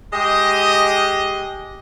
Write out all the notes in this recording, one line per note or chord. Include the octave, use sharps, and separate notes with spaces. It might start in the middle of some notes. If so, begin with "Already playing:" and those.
G#3 G4 D#5